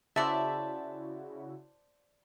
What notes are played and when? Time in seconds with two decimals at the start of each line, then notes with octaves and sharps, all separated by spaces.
0.16 C#3 E4 F#4 C5 D5 E5 A5